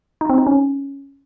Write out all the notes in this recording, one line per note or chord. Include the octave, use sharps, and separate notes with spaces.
D#4
C4
D#4
C#4